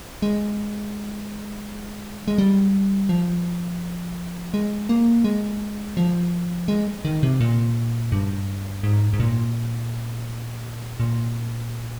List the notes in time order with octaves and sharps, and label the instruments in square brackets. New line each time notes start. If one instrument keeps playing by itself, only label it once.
[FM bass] G#3
G#3
G3
F3
G#3
A#3
G#3
F3
G#3
D#3
C3
A#2
G2
G#2
G#2
A#2
A#2